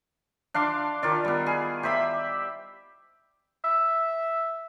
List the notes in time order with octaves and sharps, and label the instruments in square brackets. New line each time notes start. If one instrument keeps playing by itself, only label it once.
[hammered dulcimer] D4 F5 C6 D6
D#3 F4 D5
G3 B3
G#4
G4 C5 E5 B5
[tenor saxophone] E5